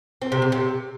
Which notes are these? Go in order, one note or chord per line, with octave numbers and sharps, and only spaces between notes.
C4
C3
C3
C3